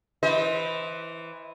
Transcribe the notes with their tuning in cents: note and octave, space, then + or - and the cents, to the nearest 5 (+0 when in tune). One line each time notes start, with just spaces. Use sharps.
E3 +0 C5 +0 D#5 +35